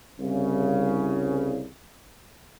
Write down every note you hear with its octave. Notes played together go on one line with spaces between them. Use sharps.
C2 C#3